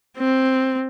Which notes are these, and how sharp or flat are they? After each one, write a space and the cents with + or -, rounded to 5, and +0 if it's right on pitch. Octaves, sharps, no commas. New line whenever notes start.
C4 +5